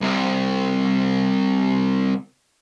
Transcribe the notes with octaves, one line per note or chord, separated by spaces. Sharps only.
C2 C3